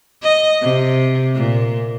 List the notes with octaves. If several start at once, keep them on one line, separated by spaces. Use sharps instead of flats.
D#5
C3
A#2